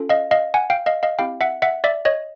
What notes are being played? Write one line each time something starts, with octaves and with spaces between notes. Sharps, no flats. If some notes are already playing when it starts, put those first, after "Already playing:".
Already playing: C#4 F4 A4
D#5 F5
D#5 F5
F#5 G#5
F5 G5
D#5 F5
D#5 F5
C4 E4 G4 F5 G5
E5 F#5
E5 F#5
D5 E5
C#5 D#5